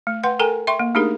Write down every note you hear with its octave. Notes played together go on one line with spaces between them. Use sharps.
A3
B4 F#5 G5 C6
A4 A#4 G5 G#5 A#5
E5 G5 C6 C#6
A#3
A3 D4 D#4 G4 G#4 A#4